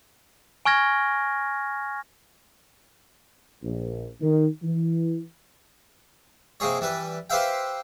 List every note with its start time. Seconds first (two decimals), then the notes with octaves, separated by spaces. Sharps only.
0.65 G#5 C#6 F6 G#6 A#6
3.63 A#1
4.21 D#3
4.62 E3
6.60 C3 A#3 D#4 G#4 C#5
6.81 E3 G3 B4
7.30 G4 B4 C5 E5 F5 G5